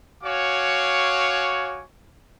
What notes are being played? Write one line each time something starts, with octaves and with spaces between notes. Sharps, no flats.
F#4 C#5 F5 G#5 C#6 D6